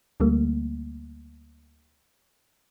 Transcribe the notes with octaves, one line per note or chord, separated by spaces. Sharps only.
D2 D3 G3 A3 A#3